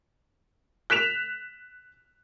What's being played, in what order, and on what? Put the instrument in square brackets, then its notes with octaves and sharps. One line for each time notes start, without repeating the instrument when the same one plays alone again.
[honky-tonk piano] F#6 B6 E7 F7